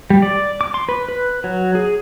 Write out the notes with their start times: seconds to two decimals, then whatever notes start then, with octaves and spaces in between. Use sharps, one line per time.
0.10 G3
0.22 D5
0.61 D6
0.74 C6
0.89 B4
1.09 B4
1.44 F#3
1.75 G#4